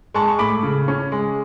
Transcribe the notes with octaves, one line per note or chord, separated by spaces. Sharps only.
G#3 A5 C#6
C#6
A2 B5 D6
C#3
C#4
G#3